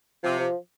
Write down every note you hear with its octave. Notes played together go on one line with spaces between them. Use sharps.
C3 F3
F3